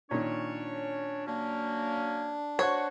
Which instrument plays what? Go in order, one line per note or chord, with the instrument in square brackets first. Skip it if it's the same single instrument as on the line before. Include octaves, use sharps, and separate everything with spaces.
[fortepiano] A#2 D#3 [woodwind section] C#4 D4 C#5
[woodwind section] F#3 A#3 C#4 [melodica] D4
[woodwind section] F#4 [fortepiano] C5 F#5 [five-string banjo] C#5